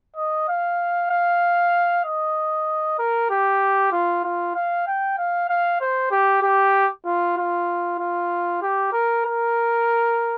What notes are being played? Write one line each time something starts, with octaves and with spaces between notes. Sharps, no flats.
D#5
F5
F5
D#5
A#4
G4
F4
F4
F5
G5
F5
F5
C5
G4
G4
F4
F4
F4
G4
A#4
A#4